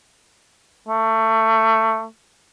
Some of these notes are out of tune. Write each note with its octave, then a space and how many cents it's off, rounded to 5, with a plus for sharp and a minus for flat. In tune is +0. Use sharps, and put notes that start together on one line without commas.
A3 +20